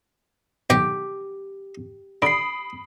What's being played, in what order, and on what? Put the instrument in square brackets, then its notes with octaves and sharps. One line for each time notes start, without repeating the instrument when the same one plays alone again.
[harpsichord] B1 D#3 G5 [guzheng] G4
[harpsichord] D3 [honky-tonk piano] B5 D#6 [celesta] C7 D7